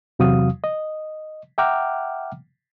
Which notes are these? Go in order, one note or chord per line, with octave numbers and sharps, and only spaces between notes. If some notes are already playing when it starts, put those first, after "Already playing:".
E2 C3 F#3 F#4 F5 D#6
D#5
E5 F#5 G5 A#5 D6 F6